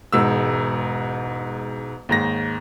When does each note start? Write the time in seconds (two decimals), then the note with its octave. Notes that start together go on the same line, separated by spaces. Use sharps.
0.13 E1 G#2 E6
2.09 D#2 G#2 A#6